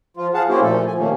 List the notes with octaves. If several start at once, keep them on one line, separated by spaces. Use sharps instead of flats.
F3 F4
G#4 F5 F#5 A5
A#3 C#4 E4 F#4 G4 C5
A#2 F3 A3 A4
F3 G#5
C3 D#3 A3 A#3 C#4